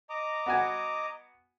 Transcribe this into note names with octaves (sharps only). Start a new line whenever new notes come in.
D#5 A#5 D6
B3 F#4 G#5